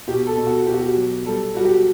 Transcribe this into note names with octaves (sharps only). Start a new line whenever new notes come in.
B2 G4
A4
B2
F#4
B2 G4
F#4
G4
F#3
G3 A4
G3 F#4
G4